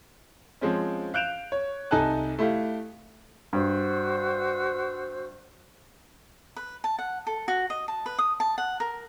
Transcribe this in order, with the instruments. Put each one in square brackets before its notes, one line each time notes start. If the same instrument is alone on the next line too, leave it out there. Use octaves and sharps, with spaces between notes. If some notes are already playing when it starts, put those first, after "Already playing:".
[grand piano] F3 G#3 C4 C#4
F5 F#6 G6 D7 E7 F7
C#5
C2 D#4 A4 G#5 A5 F#6
A3 E4 G4 F5
[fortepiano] G2 [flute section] F#4 C5 E6
[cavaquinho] B4
A5
F#5
A4
F#4
D#5
A5
B4
D#6
A5
F#5
A#4